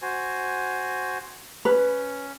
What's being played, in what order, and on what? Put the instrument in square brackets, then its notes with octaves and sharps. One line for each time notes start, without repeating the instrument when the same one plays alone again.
[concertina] F#4 C5 G#5
[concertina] C#4 [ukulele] B4